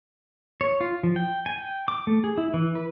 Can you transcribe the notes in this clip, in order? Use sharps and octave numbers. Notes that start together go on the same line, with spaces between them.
C#5
F4
F3
G5
G#5
G5
D6
A3
G#4
E4
E3
B4